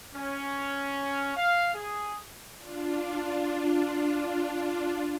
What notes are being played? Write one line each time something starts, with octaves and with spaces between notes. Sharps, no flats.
C#4
F5
G#4
D4 F4